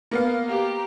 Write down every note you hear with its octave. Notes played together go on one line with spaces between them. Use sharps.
A#3 B3 F5
G4 A#5